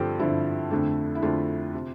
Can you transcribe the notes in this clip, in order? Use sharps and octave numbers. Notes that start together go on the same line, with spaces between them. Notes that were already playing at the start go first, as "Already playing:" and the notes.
Already playing: G2 D3 F3 C4 G4 A4
G2 D3 F3 C4 E4
F2 D3 A3 D4
E4
F2 D3 A3 D4 F4
C3